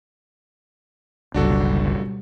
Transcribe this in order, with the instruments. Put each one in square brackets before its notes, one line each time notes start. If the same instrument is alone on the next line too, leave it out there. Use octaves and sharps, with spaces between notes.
[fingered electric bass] G1 C#2 [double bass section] B2 F#3 G3 [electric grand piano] D4 F#4 A4